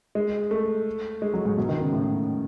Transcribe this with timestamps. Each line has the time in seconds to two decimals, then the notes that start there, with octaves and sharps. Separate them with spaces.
0.15 G#3
0.51 A3
1.22 G#3
1.34 F#3
1.45 G#2
1.57 B2
1.69 D#3
1.81 C#3
1.93 A2